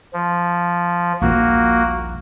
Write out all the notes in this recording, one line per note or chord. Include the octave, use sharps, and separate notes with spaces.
F3
D#1 A#1 A#3 F#4